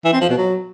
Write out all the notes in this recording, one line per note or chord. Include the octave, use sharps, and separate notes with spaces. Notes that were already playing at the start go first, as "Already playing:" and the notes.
E3
C4
F3
B2
F#3